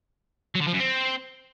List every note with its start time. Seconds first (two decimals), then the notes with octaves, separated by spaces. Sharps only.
0.55 F#3
0.62 D3
0.68 F3
0.74 F#2
0.80 C4